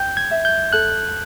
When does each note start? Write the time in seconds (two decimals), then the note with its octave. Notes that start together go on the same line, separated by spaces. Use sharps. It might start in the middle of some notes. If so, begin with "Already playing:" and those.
Already playing: G5 G6
0.17 G#6
0.31 E5
0.45 G6
0.73 A4 F#6